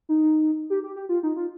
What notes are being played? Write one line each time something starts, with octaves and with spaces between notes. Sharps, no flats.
D#4
G4
G4
G4
F4
D#4
F4